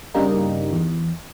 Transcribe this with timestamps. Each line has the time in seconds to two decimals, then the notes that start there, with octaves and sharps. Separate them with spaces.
0.14 G2 C#3 G3 A#3 D#4
0.73 E2